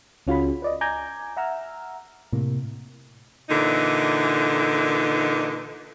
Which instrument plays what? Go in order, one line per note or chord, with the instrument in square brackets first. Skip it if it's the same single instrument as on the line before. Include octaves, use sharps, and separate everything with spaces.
[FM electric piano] C#2 C#4 F4 F#4 G#4 B5
B4 D5 D#5
G#5 A#5 D6 G6 G#6
E5 F#5 A#5 E6 F6
A2 C3 A#3
[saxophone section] A#2 D3 E3 D#4